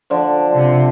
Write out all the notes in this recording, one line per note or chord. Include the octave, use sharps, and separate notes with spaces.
D3 F3
C3